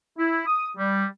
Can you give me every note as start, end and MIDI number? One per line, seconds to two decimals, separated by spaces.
0.18 0.45 64
0.46 0.69 87
0.77 1.04 55